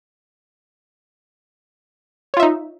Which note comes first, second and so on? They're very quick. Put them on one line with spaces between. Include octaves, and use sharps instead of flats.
C#5 F4 E5 D#4